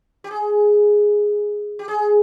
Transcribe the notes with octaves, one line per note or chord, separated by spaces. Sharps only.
G4
G#4
G4
G#4